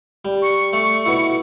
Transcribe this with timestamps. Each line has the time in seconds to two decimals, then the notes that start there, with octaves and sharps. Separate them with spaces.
0.25 G3
0.42 C#6
0.73 A3 C#6
1.06 B2 E4